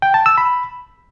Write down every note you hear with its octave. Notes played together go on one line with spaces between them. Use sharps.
G5
A5
E6
B5